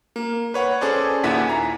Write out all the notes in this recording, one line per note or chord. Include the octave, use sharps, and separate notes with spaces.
A#3
B4 C#5 F#5
C#4 G#4 A4 C5 D5
D#2 A#2 E4 F#5 G#5 B6
A#5